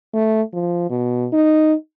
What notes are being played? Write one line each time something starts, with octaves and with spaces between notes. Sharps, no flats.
A3
F3
B2
D#4